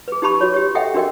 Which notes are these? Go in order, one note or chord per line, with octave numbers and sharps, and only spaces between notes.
G#4 B4
D#4 G4 A5 B5 C#6
F#4 C#5
G4 C#5
A4 D#5 E5 F#5 G5
D4 F#4 A#4 D#5 G5